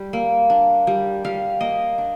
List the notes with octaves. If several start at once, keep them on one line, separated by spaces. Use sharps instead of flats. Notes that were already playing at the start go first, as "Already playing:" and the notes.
Already playing: G3
A#3
D4
G3
G3 F5
A#3 D#5
D4